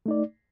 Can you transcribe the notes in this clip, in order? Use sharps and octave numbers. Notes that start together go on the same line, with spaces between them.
A3 D#4 D5